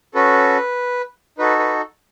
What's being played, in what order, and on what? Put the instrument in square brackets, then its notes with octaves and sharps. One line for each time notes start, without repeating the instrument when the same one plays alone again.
[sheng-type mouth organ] C#4 F#4 A4 B4
D#4 F#4 A4 B4
B4